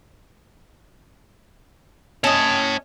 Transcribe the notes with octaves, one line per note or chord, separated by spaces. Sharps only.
C#4 C#5 D#5 A5